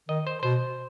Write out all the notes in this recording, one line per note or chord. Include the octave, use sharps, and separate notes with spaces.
D#3 D#5
C5
B2 C5